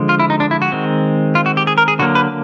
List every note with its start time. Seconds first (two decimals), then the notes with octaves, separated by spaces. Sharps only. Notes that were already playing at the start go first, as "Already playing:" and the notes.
Already playing: D3 F3 G#3
0.09 F4
0.19 E4
0.30 D#4
0.40 D4
0.51 E4
0.62 F#4
0.72 D#3 G#3 C4
1.35 F4
1.46 F#4
1.57 G4
1.67 G#4
1.78 A#4
1.88 G#4
1.99 D3 F#3 A#3 F#4
2.15 B4